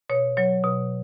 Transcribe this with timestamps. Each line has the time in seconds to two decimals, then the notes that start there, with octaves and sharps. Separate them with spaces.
0.10 B2 C#5
0.37 F#3 C#5
0.64 B2